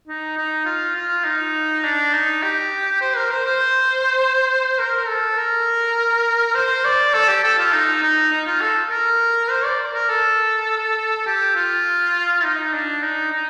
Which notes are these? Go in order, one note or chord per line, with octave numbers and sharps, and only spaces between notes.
D#4
D#4
F4
F4
D#4
D4
D#4
G4
C5
A#4
C5
C5
A#4
A4
A#4
C5
D5
A4
G4
A4
F4
D#4
D#4
D#4
F4
A4
A#4
C5
D5
A#4
A4
G4
F4
D#4
D4
D#4
D#4